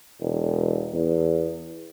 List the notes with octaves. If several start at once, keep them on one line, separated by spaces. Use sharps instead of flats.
E1
E2